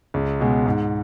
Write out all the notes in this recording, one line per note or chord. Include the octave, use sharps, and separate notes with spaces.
C#2
B2 G#3
G#2